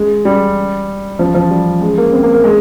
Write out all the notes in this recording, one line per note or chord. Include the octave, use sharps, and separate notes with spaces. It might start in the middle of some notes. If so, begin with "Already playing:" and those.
Already playing: G#3
G3
F3
F3
G3
G#3
A#3
C4
A#3
A#3
G#3